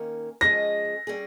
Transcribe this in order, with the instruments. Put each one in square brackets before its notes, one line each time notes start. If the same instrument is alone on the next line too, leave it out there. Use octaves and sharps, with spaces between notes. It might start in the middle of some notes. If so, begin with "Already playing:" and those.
Already playing: [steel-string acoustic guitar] D#3 A#3 C#4
[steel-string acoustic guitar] F3 G#3 C#4 G#4 D#5 [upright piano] A#6
[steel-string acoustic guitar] G3 C#4 G#4